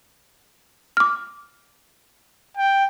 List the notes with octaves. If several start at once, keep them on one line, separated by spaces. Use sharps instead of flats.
D6 F6
G5